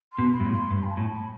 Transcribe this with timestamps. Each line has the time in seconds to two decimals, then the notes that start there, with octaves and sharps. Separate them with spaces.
0.12 C6
0.18 B2
0.32 B5
0.40 G2
0.45 A2
0.51 C6
0.70 G2 B5
0.83 G5
0.90 A5
0.97 A2
1.11 B5